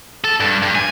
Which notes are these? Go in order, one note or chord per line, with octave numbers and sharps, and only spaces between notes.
A4
G2
G2
G#5